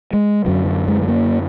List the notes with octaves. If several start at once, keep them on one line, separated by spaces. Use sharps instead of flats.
G#3
F#2 D3 F#3
F#3
G#3
G#3
A#3